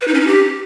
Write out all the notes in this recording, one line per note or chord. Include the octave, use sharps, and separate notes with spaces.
B4
D#4
C#4
D#4
G4